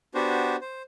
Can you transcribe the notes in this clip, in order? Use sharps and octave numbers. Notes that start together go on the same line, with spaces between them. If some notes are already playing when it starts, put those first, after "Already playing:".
B3 D4 F#4 G4 C5
C5